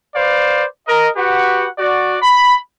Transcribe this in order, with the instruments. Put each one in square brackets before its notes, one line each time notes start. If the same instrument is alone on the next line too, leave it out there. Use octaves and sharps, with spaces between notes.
[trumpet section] B4 C5 D5 F5
A#4 D#5
F#4 G4 B4 F#5
F#4 D5
B5